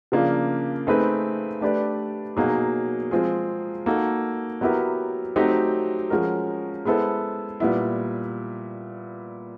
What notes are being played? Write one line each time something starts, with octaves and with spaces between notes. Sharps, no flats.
C#3 F3 A#3 D4 F4
A3 C4 D#4 G#4 B4
A3 D4 G4 B4 D5
B2 F#3 A#3 D#4 G#4
F3 G#3 C4 F4 G#4
A#3 D#4 F#4 A4
F#3 B3 E4 G4 A#4
F#3 A3 C4 D#4 G4
F3 G#3 C#4 F#4 A#4
G#3 B3 E4 A4 C5
A#2 G3 B3 E4